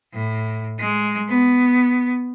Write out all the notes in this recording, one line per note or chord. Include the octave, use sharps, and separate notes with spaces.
A2
G#3
B3